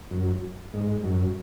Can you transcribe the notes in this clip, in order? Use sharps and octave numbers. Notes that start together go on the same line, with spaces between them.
F#2
G#2
F#2